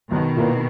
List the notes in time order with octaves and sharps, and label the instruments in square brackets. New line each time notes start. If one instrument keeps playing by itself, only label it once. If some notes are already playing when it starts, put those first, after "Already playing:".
[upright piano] B1 [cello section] B2 D#3
[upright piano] A#2 A#3 E4 B4